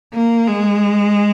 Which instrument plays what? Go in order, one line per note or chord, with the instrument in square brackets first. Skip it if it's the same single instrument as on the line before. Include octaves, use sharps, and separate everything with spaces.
[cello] A#3
G#3